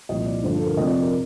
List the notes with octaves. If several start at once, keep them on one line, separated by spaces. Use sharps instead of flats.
C2 A#2 F3 D#5
D5
G2 D3 F3 C5
A4
A#4
F2 C3 F3 D#5
D5
A#4